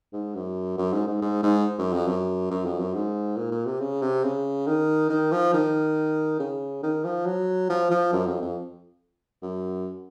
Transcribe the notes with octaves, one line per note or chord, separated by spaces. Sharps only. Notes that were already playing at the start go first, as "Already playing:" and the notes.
G#2
F#2
F#2
G#2
G#2
G#2
G#2
F#2
F2
F#2
F#2
F2
F#2
G#2
A#2
A#2
C3
C#3
C3
C#3
D#3
D#3
F3
D#3
C#3
D#3
F3
F#3
F3
F3
F#2
F2
F2
F#2